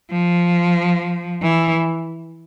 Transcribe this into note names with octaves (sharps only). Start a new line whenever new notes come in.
F3
E3